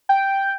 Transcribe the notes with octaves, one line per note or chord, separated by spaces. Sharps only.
G5